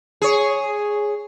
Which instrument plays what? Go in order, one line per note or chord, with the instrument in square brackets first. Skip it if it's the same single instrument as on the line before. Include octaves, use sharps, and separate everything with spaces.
[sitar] G#4 C#5